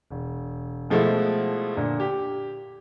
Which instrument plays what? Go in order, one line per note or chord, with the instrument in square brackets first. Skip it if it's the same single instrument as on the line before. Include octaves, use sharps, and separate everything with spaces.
[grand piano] E1
B2 F3 G#3 A3 E4 F4
A#2 D3
G4